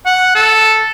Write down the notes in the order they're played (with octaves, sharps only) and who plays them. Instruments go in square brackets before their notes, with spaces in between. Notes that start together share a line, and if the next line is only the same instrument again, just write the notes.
[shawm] F#5
A4